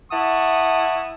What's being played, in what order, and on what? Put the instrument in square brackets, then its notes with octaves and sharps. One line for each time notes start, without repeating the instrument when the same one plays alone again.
[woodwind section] E4 E5 F#5 A5 C#6 D#6